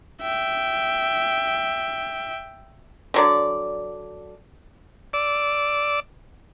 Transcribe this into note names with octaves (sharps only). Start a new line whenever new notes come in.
E5 G5
D3 F#3 D5
D5 D6 E6